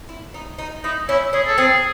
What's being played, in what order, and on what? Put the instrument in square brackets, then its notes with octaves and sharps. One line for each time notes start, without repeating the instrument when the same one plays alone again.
[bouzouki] E4
D#4
D#4
[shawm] D#4 [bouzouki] E4
[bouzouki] C#4 [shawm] E4
[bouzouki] C#4 [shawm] G#4
[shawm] A4
[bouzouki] C4 [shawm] G#4